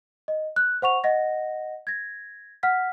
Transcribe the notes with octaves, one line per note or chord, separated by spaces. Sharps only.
D#5
F#6
C5 F#5 C#6 F7
D#5 F#5 A#6
G#6 A#6
F#5 F6 B6